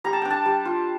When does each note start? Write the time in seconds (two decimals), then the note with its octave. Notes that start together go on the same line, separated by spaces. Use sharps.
0.04 G3 A#5
0.13 A5
0.22 D4 G5
0.30 A5
0.45 G3
0.65 F4